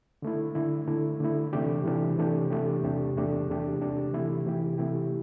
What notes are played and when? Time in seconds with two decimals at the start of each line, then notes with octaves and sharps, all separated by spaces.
0.22 D3 A3 E4
0.55 D3 A3 E4
0.88 D3 A3 E4
1.20 D3 A3 E4
1.53 C3 E3 A3 D4 G4
1.85 C3 E3 A3 D4 G4
2.18 C3 E3 A3 D4 G4
2.50 C3 E3 A3 D4 G4
2.83 E2 C3 A3 D4 G4
3.16 E2 C3 A3 D4 G4
3.48 E2 C3 A3 D4 G4
3.81 E2 C3 A3 D4 G4
4.13 C3 E3 A3 E4 G4
4.46 C3 E3 A3 E4 G4
4.78 C3 E3 A3 E4 G4